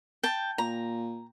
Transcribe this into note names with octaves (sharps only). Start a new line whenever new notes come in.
G5 A5
A#2 A#5